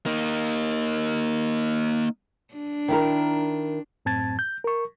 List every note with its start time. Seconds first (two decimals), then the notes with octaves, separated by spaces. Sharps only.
0.06 A#3 D#4
2.55 D4
2.88 D#3 E4 A#4
4.05 F#2 A2 C4 A5 G#6 A6
4.39 G6
4.64 A#4 C#6